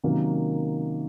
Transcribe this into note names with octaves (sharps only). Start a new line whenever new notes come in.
C3 D#3 F#3 A#3 C#4